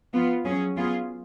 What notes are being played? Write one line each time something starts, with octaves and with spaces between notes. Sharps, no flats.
F3 B3 F4
F#3 C#4 G#4
F#3 B3 F4 G#4